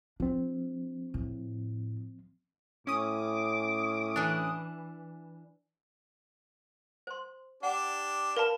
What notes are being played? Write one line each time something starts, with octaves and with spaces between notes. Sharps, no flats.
F3 C4 D4
A2
A2 C#4 D6 D#6
E3 D4
C5 C6
D4 G4 F#5
A#4 B4 F5 A5 B5